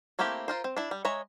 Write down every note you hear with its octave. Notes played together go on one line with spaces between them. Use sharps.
A3 A#3 C4 E4 G4
F4 A#4 C5
C4
D4 E4
G3
G#3 C#5 E5 A#5